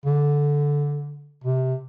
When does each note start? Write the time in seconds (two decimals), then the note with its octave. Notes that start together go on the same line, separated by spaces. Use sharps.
0.06 D3
1.44 C3